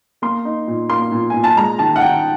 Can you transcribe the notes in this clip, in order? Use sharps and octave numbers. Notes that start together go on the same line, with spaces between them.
A#3 C6
D#4
A#2
A#3 C6
A#2
A#2 G#5
A5
G#3 A#5
D#3 A5
F#5
D#3 G5